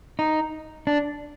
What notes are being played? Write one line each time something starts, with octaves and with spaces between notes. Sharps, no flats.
D#4
D4